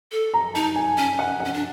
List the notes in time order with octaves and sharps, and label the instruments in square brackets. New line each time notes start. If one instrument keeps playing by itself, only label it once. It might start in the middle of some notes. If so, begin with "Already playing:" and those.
[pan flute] A4
[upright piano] A#5
[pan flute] D#4 [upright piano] A5
[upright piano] G#5
[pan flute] C#4
[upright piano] F#5
F#5
[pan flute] C#4
D4